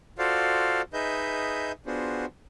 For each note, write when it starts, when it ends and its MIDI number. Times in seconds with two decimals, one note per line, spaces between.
0.19 0.82 65
0.19 0.82 66
0.19 0.82 69
0.19 0.82 72
0.19 0.82 74
0.19 0.82 77
0.93 1.72 63
0.93 1.72 68
0.93 1.72 71
0.93 1.72 75
0.93 1.72 76
0.93 1.72 91
1.86 2.25 59
1.86 2.25 62
1.86 2.25 65
1.86 2.25 66
1.86 2.25 68
1.86 2.25 72